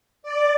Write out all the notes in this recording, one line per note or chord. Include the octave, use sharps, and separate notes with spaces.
D5